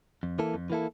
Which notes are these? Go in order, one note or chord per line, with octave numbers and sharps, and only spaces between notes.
F2
E3 A#3 E4 A4
F2
E3 A#3 E4 A4